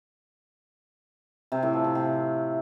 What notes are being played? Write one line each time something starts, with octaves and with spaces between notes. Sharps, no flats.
C3
A2
F3
C3
C3